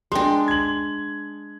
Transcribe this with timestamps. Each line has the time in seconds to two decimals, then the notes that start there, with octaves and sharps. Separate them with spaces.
0.12 G#3 D4 G5 C6
0.48 G#6 F#7